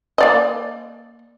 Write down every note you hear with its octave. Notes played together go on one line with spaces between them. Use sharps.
A#3 D5 D#5